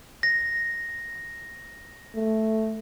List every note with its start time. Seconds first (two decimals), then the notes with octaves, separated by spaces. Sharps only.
0.23 A#6
2.15 A3